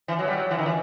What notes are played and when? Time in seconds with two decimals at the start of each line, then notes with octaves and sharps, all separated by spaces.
0.08 E3
0.19 F#3
0.28 G3
0.37 F#3
0.51 E3
0.58 D#3
0.66 E3